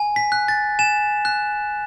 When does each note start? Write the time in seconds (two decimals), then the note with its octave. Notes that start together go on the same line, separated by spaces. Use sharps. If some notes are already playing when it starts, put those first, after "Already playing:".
Already playing: G#5
0.16 B6
0.32 F#6
0.48 A6
0.79 G#5 E7
1.25 F#6